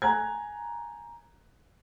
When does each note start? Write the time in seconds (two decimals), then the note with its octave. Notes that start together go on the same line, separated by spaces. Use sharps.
0.02 G#5 A#5 F#6 G#6